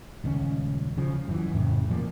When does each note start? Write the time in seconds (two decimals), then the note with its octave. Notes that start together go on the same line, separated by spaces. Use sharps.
0.24 D#1 C#2 C3 C#4
0.97 C#3 F3
1.28 F#2 E3
1.54 F2 A2 C#3
1.89 A#2 F3 A#3